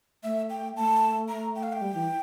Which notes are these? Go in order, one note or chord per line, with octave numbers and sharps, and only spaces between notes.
A3 E5
G5
A3 A5
A#5
G5
F5
G5
G3
E3